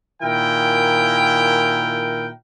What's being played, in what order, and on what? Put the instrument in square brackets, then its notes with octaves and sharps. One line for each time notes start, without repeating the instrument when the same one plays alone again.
[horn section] A#2 D#3 E4 A#4 G5